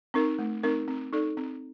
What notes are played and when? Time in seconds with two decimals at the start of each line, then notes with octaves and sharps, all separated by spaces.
0.14 C4 D#4 A#4
0.39 A3
0.63 C4 D#4 A#4
0.88 C4
1.12 D#4 A4 D5
1.37 C4